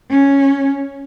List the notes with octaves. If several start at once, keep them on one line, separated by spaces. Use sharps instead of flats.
C#4